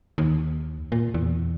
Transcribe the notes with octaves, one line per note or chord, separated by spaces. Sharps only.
D#2
A#2
E2